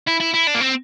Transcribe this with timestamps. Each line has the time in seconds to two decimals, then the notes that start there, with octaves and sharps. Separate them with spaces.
0.07 E4
0.20 E4
0.34 E4
0.47 D4
0.54 A#3
0.60 C4